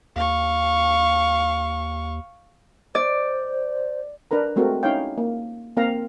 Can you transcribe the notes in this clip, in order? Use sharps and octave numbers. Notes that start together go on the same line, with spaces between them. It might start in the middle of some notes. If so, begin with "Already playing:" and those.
D#2 F5 C#6
C5 D5
D4 A#4 B4 A#5
G#3 A3 C4 F#4 A4 A#4
C#4 D#4 E4 C#5 F5 G5
A#3
A#3 C4 A#4 F5 A#5